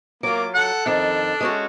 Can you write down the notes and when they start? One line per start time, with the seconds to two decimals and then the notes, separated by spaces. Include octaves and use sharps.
0.23 F#3 A#3 F4 D6
0.54 A4 F#5
0.86 F2 D#3 D4
1.41 G#3 C#4 F#4